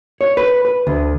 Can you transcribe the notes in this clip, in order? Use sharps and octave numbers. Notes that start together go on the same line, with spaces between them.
C#5
B4
B4
D2